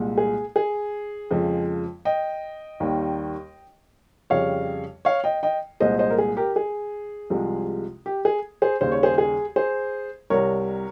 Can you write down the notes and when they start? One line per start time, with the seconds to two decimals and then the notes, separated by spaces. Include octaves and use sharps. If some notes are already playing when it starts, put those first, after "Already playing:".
Already playing: C2 A#2 G#3
0.18 G#4
0.56 G#4
1.31 F2 C#3 F3 G#3
2.05 D#5 G5
2.80 D#2 D#3 G3
4.30 F2 C#3 G3 C#5 F5
5.05 C#5 F5
5.24 D#5 G5
5.43 D#5 G5
5.80 C2 A#2 G#3 C5 D#5
5.99 C5 D#5
6.11 A#4
6.18 G#4
6.37 G4 A#4
6.56 G#4
7.30 C2 C3 F3 G#3
8.06 G4
8.25 G#4
8.62 G#4 C5
8.81 D#2 C#3 G3 C5
8.92 C#5
9.03 G#4 C5
9.18 G#4
9.56 G#4 C5
10.30 C2 C3 G3 A#4 C#5